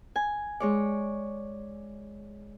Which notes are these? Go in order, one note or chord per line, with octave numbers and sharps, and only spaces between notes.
G#5
G#3 C#5 D5